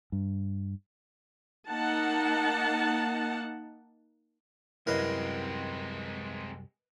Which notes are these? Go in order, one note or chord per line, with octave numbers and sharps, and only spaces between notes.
G2
A#3 D#4 F#5 A5
C2 F#2 G#3 C4 E4 A#4 B4 D#5